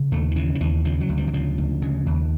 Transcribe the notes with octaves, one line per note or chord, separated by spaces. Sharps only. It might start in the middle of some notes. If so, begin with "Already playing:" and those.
Already playing: C#3
D#2 A3
D#3
C#3 E3
D#3
D#2 E3
C#3 F3
F#3
D2
G3
E3
C#3 F3
D2
C#3
D#2